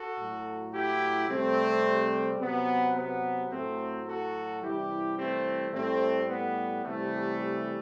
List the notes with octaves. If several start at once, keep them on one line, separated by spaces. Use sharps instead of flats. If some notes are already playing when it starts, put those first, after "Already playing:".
Already playing: F#4 A4
A2 F#3
E4 G4
C3 G3 A3 C4
C3 F#3 B3
B3
A2 F#3 A3 C4
F#4 A4
C3 E3 G3 E4 G4
A3 C4
A2 G3 A3 C4
B3
C3 E3 G3 A3